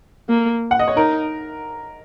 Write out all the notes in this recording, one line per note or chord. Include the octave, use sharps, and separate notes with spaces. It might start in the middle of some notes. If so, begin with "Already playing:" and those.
A#3
F#5
D#5
C#5
D#4 A#4